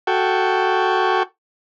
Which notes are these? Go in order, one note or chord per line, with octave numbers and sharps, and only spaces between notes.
F#4 A4 G5 C#6